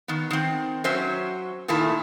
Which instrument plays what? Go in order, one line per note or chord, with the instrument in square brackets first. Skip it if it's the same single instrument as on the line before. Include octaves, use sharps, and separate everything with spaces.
[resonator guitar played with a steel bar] D#3 B3
D#3 C4
F#3 C#4 C5 E5
A#2 D#3 A3 E4 A5